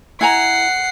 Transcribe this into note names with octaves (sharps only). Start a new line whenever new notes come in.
E4 F#5 G#5 A#5 C7